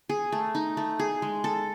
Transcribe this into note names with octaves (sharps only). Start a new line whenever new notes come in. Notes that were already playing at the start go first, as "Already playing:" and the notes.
G#4
A3
D#4
A3
G#4
G#3
A4